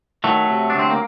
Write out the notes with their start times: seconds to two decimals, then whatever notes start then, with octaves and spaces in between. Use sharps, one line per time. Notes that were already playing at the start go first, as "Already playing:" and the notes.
0.24 D#3 F#3 A3
0.50 C3
0.70 D4
0.75 D2 C4
0.90 A#3